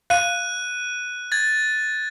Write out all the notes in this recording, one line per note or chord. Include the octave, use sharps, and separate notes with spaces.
F5 F#6 D#7
G#6 A6